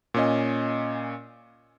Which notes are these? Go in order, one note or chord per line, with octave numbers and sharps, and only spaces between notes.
A#2 C#4 D#5